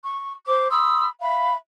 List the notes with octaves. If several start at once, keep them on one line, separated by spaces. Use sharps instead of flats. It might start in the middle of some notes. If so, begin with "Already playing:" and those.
C#6
C5 D6
B5 C6 D#6 E6
E5 F5 B5